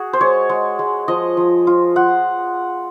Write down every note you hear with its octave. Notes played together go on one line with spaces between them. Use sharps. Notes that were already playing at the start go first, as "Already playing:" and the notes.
Already playing: F#4 G#4
C5
G#3 C#5
G#3
G#3
F3 D#5
F3
F4
F4 F#5